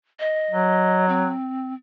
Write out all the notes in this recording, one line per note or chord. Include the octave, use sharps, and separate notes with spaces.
D#5
F#3
C4